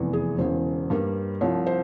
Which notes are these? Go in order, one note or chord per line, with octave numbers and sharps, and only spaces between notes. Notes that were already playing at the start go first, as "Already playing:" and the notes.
Already playing: F1 E2 C3 E3
G#4
E1 E2 C#3 C5
G2 G3 A#3
C2 C3 F3 C#5
C5